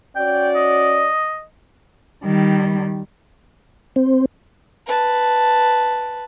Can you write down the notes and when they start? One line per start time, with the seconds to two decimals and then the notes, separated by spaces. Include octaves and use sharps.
0.16 C#4 F#4 D5 G5
0.56 D#5
2.24 D#3 G3
3.96 C4
4.87 B4 A5